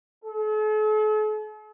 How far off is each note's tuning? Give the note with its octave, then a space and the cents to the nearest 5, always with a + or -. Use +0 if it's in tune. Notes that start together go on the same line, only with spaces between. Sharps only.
A4 -45